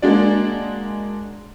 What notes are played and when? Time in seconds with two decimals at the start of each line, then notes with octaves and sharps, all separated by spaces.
0.02 G#3 A#3 D4 F#4 D5